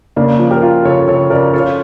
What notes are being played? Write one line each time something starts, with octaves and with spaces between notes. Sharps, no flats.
C#3 A#3 D4
F3
G4 A#4
F4
C#3 A4 C#5
C#3 A4 C#5
C#3 A#4 D5
F4 A4 C#5